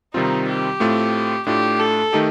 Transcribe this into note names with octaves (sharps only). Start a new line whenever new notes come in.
C3 D#3 G3 C4 D#4 F4
G4
A2 A3 C4 F4
A2 A3 D4 F4 G4
A4
D#3 A3 D#4 G4